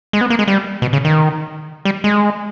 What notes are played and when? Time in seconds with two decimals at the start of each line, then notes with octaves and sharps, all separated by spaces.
0.13 G#3
0.21 B3
0.30 A#3
0.39 G#3
0.48 G3
0.82 B2
0.93 C#3
1.05 D#3
1.85 G3
2.04 G#3